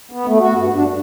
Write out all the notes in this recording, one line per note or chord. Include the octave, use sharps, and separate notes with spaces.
B3
A3
F#4
G2
D4
G2